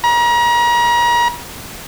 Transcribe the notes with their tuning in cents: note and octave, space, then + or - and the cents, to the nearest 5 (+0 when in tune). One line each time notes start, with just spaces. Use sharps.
A#5 +40